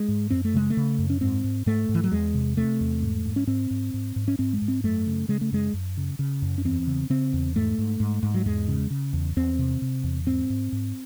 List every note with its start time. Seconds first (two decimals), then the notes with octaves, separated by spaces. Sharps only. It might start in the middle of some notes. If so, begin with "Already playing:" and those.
Already playing: G#3
0.08 G#2
0.30 F#2 C4
0.45 A3
0.54 C#3 G#3
0.70 A3
0.77 C#3
0.98 F#2
1.10 C#4
1.21 G#2 C4
1.44 G#2
1.66 G#2 A3
1.89 G#2
1.95 E3
2.04 F#3
2.12 E2 G#3
2.34 C3
2.57 C3 A3
2.80 E2
3.02 G#2
3.25 G#2
3.36 C#4
3.47 G#2 C4
3.71 G#2
3.94 G#2
4.16 G#2
4.28 C#4
4.39 G#2 C4
4.53 G#3
4.62 G#2
4.68 C4
4.84 F#2 A3
5.07 C#3
5.28 C#3 G#3
5.41 A3
5.52 F#2 G#3
5.74 F#2
5.97 C#3
6.19 C#3
6.42 F#2
6.58 C#4
6.65 E2 C4
6.87 C#3
7.10 C#3 C4
7.33 E2
7.56 G#2 A3
7.78 G#2
8.00 G#2
8.23 G#2
8.34 F#3
8.46 E2 G#3
8.68 C#3
8.90 C#3
9.13 E2
9.36 E2 C4
9.59 C3
9.82 C3
10.04 E2
10.26 G#2 C4
10.50 G#2
10.72 G#2